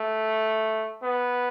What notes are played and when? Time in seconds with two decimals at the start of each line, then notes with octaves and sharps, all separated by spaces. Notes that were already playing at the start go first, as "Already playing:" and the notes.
Already playing: A3
1.03 B3